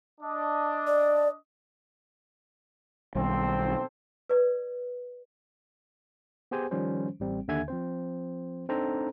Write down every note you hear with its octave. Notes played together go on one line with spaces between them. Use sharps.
D4 D#5
D5
B1 D#3 G3 C4 A4 C5
B4 D5
B3 G4 G#4 C5 G#5
D#3 F3 G3 C#4 C5
A1 G3 C4
D#2 D3 E5 G#5 G#6
F3 C4 C5
C4 D4 D#4 A4 C5 A#5